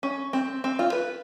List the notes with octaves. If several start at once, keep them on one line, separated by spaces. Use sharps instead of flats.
C#4
C4
C4
F4
B4